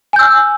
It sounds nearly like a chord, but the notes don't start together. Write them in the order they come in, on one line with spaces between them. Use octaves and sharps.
G#5 G6 E6 F6